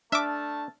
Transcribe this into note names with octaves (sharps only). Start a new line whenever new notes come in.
A3 D4 E5 A5 D6 E6 F6